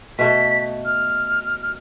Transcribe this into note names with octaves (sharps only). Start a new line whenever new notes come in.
B2 A3 B6
F6